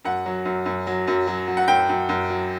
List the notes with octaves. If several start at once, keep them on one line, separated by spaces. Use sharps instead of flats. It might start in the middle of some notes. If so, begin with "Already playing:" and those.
F#2 F#5
F#3
F#2
F#2
F#3
F#2
F#3
F#3
F#5
F#2 G5
F#2
F#2
F#3